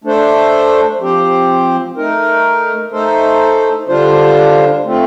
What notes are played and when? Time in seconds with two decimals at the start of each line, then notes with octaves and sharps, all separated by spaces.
0.04 A3 D4 A4 C5
1.00 F3 C4 G4 C5
1.97 A3 D#4 A#4
2.92 A3 D#4 A4 C5
3.88 D3 G3 D4 F4 C5
4.84 A3 C4 F4